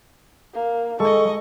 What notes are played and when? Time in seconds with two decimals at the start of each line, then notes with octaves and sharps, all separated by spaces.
0.53 A#3
1.00 G#3 A4 D#5 C#6